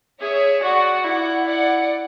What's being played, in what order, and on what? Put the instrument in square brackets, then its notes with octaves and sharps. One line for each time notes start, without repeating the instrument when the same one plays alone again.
[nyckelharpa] G#4 [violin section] C#5 E5
[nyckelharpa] F#4 [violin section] D5 F#5
[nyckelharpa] E4 [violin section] D5 F#5
[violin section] D5 F#5